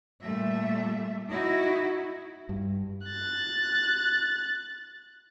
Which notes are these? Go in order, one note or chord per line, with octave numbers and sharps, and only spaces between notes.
A#2 G3 A3 E5
D#4 E4 F#4
G2
F#6 A6